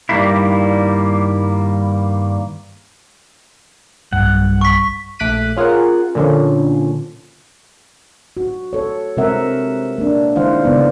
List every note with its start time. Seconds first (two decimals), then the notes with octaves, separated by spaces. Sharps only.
0.09 G2 D#3 G3 A#3 E4
4.13 B1 G2 F#5
4.61 C#6 B6
5.19 A#1 A3 D6 F#6 B6 D#7
5.56 C#4 F4 G#4 A#4 F#5
6.15 A#2 D3 F3 C#4
8.37 F#4
8.73 A4 C#5
9.17 C3 G#3 C4 A#4 E5 F#5
9.98 A#3 D4
10.36 D#3 G#3 E4 C5 F5 F#5
10.64 C#3 G#3 B3 D5